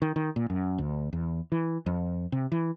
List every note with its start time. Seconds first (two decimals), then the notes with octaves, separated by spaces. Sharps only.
0.02 D#3
0.16 D#3
0.36 A#2
0.50 F#2
0.78 D2
1.13 E2
1.52 E3
1.86 F2
2.32 C3
2.52 E3